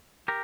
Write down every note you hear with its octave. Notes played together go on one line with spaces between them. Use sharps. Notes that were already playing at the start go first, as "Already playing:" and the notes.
G4 A#4